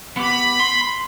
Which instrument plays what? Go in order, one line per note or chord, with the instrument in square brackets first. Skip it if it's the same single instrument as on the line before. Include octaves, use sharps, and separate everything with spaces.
[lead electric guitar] B3 G4 [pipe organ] B5
[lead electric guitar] C6